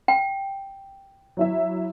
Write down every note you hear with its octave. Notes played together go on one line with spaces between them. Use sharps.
G5
F#3 E4 E5